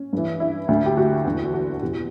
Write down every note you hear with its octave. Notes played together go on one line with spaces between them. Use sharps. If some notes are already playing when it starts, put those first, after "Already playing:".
Already playing: C#4
G2 E3
E4
D2 D3
G4
F#4
E2 D3
F#4
E2 B2 G4